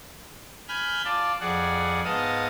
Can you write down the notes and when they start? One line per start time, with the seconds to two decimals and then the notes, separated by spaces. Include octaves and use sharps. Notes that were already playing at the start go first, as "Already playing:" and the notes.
0.69 G#5 B5 F6 G6
1.05 F4 D5 A5
1.41 F2 G#4 D5 F#5
2.05 G#2 B3 D#5 F5 A5 D#6